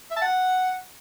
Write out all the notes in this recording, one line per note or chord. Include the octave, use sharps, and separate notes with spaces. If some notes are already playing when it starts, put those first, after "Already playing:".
E5
A5
F#5